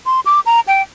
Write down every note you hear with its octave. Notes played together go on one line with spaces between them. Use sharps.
C6
D6
A#5
G5